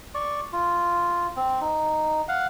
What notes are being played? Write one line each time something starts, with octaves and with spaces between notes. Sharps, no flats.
D5 C#6
F4
C4
D#4
F5 F#5